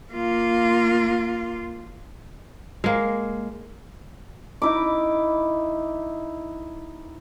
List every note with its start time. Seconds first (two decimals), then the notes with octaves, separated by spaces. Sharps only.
0.12 A#3 F4
2.84 G#3 A#3
4.62 D#4 E4 D6